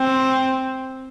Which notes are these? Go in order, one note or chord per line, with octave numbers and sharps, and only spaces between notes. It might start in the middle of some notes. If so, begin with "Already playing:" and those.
Already playing: C4